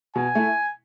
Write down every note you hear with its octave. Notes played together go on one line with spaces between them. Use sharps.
B2 G#5
A3 E4